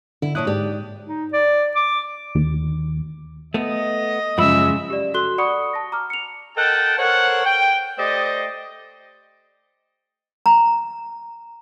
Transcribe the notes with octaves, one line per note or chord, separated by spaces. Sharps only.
D3 E4
A#2 D4 E4 C#5 D#6 F#6
G#2 G4 D5
D#4
D5
D6
D#2
A3 B3 D#5
F#2 C#3 F3 G#3 E5 B5
G4 D5
F#4 A4 C6 F#6 G7
D5 F#5 B5 C#6 D#6 C#7
A5 A#6
A#5 D6 F6
C#7 F7
A4 A#4 D#5 F#5 G5 A5
A4 A#4 C5 C#5 F#5
G5
A3 G4 C5 D5 D#5
A#5